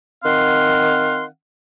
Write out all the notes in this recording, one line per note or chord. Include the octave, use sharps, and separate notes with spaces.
D#3 C4 F5 F#5 C6